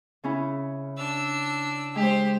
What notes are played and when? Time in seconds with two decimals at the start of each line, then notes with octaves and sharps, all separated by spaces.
0.24 C#3 C#4 E4
0.97 D4 E6
1.96 G#3 G4 C5